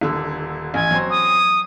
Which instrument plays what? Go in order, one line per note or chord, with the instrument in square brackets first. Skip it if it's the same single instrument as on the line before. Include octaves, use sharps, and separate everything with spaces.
[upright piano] D#1 D3 E6
[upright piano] A1 [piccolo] G#5
[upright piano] F#3 C4 C5
[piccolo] D#6